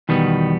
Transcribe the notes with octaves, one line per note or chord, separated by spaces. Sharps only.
E2 B2 D#3 G3 B3